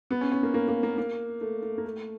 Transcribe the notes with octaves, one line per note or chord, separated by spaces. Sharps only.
B3
C#4
C#4
A#3
A#3
A#3
A#3
A#3
A3
A3
A#3
A3